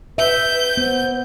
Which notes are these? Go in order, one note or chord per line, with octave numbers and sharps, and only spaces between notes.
B4 E5 G6
B3 C5